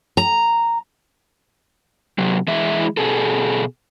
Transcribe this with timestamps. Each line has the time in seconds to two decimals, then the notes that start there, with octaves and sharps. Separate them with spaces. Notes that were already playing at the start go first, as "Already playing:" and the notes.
0.17 A#5
2.18 C3 F#3
2.48 E3 G#3 E4 E5
2.97 B2 G#4 A4